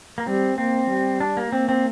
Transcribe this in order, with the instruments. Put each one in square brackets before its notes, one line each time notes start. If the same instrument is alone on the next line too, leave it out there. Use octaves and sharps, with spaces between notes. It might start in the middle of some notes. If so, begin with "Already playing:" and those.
[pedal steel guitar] A#3
[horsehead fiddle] G3 [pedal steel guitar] C4
[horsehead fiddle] A#3 [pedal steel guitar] C4
[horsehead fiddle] G3
[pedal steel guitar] D4
A#3
[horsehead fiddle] A#3 [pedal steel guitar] C4
[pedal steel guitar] C4